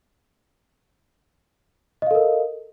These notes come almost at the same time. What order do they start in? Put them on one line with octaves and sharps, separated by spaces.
D#5 F5 A4 A#4